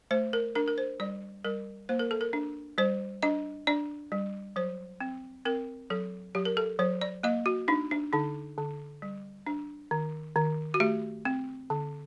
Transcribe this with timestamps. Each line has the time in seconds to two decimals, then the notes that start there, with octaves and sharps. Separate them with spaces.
0.11 A3 C5
0.33 A#4
0.55 D4 A#4
0.68 A#4
0.78 C5
1.00 G3 D5
1.45 G3 A#4
1.89 A#3 C5
1.99 A#4
2.11 A4
2.21 A#4
2.33 D4
2.78 G3 C5
3.23 D4 D#5
3.67 D4 D5
4.12 G3
4.56 F#3 C5
5.01 C4
5.45 C4 A#4
5.90 F#3 A4
6.35 F#3 G4
6.45 A#4
6.57 A4
6.79 F#3 C5
7.01 D5
7.23 A#3 D#5
7.46 F#4
7.68 D4 D#4
7.91 D4
8.13 D3 D#4
8.58 D3
9.02 G3
9.47 D4
9.91 D#3
10.36 D#3
10.74 F#4
10.80 A3 G4
11.25 C4
11.70 D3